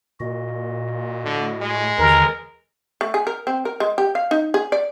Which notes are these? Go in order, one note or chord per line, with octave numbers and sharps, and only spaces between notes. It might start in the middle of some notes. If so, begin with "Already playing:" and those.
A#2 F#4 D#5
A2 D3
G#3
D#2 D3 E3 A#4
A3
G#4
A#4
C4
A#4
G#3
G4
F5
D#4
G#4
D5